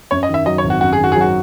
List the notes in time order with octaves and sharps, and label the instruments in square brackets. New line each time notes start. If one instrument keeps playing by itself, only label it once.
[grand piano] F#2 [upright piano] C#5
[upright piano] D#5
[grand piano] D#3 [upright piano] E5
[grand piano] F#3 [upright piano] D#5
[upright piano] C#5
[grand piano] G#1
[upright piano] F#4
[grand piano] F#2 [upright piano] F#4
[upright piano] G#4
[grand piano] D#3
[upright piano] F#4
G#4
[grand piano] F#3
[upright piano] F#4